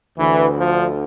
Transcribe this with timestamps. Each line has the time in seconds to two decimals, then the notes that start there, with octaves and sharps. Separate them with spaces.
0.18 D2 D3 E3
0.58 F3